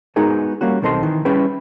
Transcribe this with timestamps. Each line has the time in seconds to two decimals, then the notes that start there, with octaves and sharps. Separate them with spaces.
0.16 G#3 B3 D#4 F#4 G#4 A#4
0.61 G3 A#3 C#4 F#4
0.82 B1 D#3 C4 A4 D#5 C6
1.03 D#3 E3
1.25 G3 C#4 E4 G#4 B4 G5